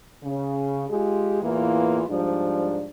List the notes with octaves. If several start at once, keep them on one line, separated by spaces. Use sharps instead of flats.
C#3
G#3 F4 G4 G#4
E2 A2 E3 A#3 F4
G#2 F3 G3 D4